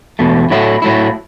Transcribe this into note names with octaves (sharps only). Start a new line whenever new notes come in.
E2 B2 A3
A2 F#3 A3 E4
A2 F#3 A3 E4